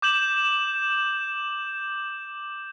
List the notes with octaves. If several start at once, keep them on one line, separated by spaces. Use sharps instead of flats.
D6 G6 E7 F#7